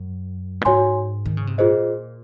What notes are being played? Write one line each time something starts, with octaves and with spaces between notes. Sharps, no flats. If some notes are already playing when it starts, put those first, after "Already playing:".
Already playing: F#2
A#2
G#2 F#4 C#5 G#5 C6
D#3
C#3
C3
A#2 F4 G#4 C5 D#5